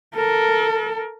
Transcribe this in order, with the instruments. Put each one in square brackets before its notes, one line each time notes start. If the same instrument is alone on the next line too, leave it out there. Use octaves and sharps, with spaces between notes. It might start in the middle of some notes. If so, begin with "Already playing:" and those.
[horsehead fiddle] A4 A#4